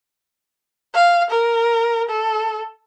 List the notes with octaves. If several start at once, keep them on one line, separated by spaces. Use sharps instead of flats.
F5
A#4
A4